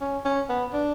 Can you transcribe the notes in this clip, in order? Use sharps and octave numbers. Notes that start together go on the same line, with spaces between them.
C#4
C#4
B3
D4